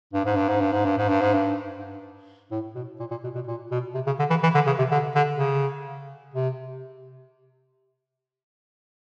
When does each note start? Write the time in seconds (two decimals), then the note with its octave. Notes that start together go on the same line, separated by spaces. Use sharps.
0.13 G2
0.25 G#2
0.36 G2
0.49 G#2
0.60 G2
0.72 G#2
0.85 G2
0.97 G#2
1.09 G2
1.21 G#2
1.33 G2
2.51 A2
2.75 B2
3.00 A#2
3.11 A#2
3.24 B2
3.35 B2
3.48 A#2
3.71 B2
3.94 C3
4.06 C#3
4.19 D3
4.30 E3
4.43 E3
4.54 D3
4.66 C#3
4.78 C3
4.91 D3
5.15 D3
5.38 C#3
6.34 C3